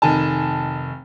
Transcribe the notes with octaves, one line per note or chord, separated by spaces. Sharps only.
F1 D#3 G#5 A5